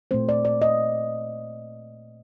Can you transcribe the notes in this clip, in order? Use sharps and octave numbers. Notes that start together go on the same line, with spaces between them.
A#2 A3 C4 C5
D5
D5
D#5